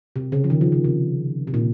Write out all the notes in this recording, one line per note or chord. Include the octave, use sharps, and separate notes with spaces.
C3
C#3
F3
D#3
F3
C#3
C3
C3
A#2